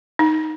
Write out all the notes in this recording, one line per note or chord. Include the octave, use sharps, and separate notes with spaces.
D#4